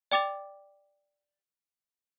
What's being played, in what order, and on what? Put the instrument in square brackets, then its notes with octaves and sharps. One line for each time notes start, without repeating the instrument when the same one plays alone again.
[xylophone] D5 G5 D6 A6 F7